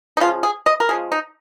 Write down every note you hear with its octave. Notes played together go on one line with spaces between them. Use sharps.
D#4
C#3 F3 G#3 F4
G#4
D#5
A#4
C#3 F3 G#3 G#4
D#4